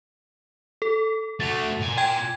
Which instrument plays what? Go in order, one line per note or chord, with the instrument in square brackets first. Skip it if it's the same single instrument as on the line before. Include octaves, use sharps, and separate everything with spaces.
[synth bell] A4
[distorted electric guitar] A3 F#4 [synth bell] A6 F7
[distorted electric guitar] A#2 G#5
[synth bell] G5 G#6